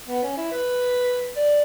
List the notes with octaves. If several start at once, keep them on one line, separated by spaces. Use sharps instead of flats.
B3
C#4
E4
B4
D5